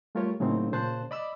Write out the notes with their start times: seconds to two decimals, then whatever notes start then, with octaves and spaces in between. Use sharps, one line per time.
0.15 G3 A3 F4 G4 A#4 C#5
0.40 A2 C#3 F#3 A#3 C4 D#4
0.72 A#2 C#3 C5 A5 F#6
1.11 D5 D#5 B5 D6 E6